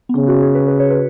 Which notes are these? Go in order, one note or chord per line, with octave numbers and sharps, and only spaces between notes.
B3
C#3 C#4
F#4
G#4
B4
B4
C#5
B4